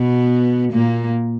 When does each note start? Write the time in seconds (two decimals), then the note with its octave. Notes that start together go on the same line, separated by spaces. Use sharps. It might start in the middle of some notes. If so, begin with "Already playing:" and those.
Already playing: B2 B3
0.72 A#2 A#3